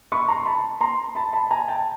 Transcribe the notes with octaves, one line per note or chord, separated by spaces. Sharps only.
B5 C#6
A#5 C6
A5 B5
A#5 C6
A5 B5
A5 B5
G#5 A#5
G5 A5